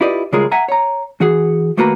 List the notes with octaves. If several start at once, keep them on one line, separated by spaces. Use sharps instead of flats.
E4 F4 G4 B4 D5 D#5
C#3 G3 G#3 F4 G#4 A#4
E5 F#5 G#5 A#5
C#5 A#5
E3 F#4 G#4
D#2 A3 A#3 F#4 B4 A#5